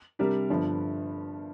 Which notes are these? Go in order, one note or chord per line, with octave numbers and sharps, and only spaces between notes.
C3 G3 D4 G4 A#4
G1 G2 D3 F3